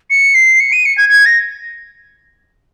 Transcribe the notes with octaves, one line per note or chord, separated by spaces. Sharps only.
C#7
C7
C#7
D#7
C#7
G#6
G#6
A#6